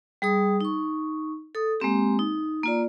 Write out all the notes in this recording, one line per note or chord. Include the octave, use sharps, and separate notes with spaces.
G3 G#4 D#6
D#4 C#6
A4 D#6
G#3 A#3 C4 G4
D#4
A#3 F4 D5